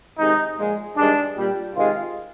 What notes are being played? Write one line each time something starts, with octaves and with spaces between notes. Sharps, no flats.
C3 D#3 G#3 D#4
A#2 F3 G#3
G2 D#3 G#3 D4
A#2 G3
C3 D#3 G#3 F4